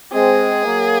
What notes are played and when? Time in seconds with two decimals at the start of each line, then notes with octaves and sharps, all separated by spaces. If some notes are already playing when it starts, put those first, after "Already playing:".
0.13 G#3 C4 G#4
0.65 F#3 A#3